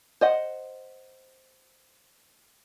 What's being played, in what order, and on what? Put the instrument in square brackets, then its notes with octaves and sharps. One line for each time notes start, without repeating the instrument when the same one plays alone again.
[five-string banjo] C5 D#5 F#5